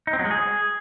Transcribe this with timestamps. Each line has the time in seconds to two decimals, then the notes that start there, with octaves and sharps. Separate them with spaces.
0.07 D#4
0.13 C4
0.19 F#3
0.25 G#3
0.31 G#4